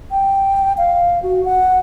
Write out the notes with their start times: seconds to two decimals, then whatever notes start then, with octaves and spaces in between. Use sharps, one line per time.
0.11 G5
0.77 F5
1.23 F#4
1.45 F#5